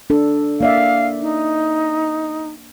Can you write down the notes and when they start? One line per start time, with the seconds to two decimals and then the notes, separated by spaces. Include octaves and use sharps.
0.10 D4 A4
0.61 A#3 D5 E5 F5
1.21 D#4